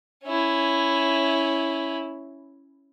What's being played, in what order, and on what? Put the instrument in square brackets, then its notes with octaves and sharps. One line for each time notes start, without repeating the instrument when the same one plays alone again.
[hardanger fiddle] C#4 E4